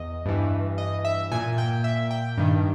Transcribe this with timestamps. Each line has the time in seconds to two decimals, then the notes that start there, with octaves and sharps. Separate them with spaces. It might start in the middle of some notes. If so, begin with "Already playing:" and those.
Already playing: E2 D#5
0.26 G2 E3
0.78 D#5
1.05 E5
1.32 A#2 G#5
1.58 G5
1.84 E5
2.11 G5
2.38 G2 D#3